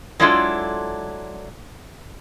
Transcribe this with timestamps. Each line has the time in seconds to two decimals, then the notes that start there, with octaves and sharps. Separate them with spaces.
0.20 F#3 G#3 D4 E4 F4 A4